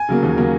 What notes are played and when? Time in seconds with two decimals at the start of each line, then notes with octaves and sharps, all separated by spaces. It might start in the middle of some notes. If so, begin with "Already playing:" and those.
Already playing: G#5
0.09 C#3 F#3 A#3
0.23 D#2
0.38 C#3 F#3 A#3